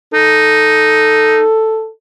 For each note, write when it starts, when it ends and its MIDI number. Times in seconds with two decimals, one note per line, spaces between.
0.14 1.44 63
0.14 1.89 69